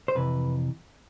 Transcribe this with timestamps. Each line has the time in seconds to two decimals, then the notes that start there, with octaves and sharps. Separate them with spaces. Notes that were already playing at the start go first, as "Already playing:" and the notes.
0.08 C5
0.15 F2 C3 E3 B4